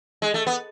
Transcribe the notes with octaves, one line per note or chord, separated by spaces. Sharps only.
G#3
A3
B3